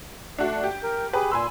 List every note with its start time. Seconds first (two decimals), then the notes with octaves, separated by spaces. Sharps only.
0.38 A3 D4 F#4
0.64 G4
0.83 A#4
1.13 G4 G#4 B4
1.32 A#2 G#5 B5 C6 E6